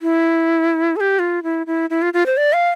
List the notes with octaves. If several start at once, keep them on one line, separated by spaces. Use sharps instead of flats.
E4
A4
G4
F4
E4
E4
E4
F4
F4
C5
D5
F5